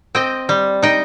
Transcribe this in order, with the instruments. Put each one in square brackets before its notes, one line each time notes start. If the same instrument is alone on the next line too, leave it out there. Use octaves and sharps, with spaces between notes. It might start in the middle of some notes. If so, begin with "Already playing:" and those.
[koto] C4 D#5 G5
G3
D#4 D#5 G5